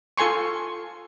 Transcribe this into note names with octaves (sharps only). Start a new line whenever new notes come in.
F4 A4 G#5 C6 C#6